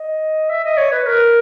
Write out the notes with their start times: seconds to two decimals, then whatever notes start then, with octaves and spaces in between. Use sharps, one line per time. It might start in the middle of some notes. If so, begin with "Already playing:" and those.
Already playing: D#5
0.50 E5
0.64 D#5
0.77 C#5
0.92 B4
1.06 A#4